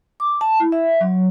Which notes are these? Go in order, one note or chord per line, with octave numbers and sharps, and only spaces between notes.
D6
A5
E4
E5
F#3